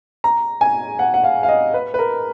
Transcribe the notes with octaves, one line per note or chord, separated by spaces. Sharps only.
A#5
G#5
F#5
F#5
F5
F5
D#5
B4
B4
A#4